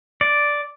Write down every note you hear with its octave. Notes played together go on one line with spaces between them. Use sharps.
D5